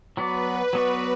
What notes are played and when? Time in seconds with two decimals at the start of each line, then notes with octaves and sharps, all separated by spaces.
0.17 F#3 B3 F#4 B4 D5
0.73 F#3 B3 F#4 D5